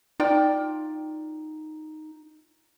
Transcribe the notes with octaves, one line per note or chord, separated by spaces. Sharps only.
D#4 F4 D5 G5